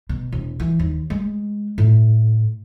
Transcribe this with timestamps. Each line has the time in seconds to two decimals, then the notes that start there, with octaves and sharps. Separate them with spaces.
0.09 B2
0.32 E1
0.60 E3
0.79 D#2
1.10 G#3
1.78 A2